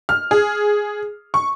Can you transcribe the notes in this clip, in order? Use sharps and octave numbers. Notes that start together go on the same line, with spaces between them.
F6
G#4
C#6